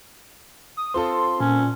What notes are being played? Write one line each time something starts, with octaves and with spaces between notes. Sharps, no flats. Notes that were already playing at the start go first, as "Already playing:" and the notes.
D#6
C4 F4 A4 C6
A#2 C#4